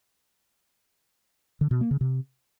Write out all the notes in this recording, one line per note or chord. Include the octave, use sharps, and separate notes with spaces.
D3
B2
A#3
C#3
C3